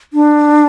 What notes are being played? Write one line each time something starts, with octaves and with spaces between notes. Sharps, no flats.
D4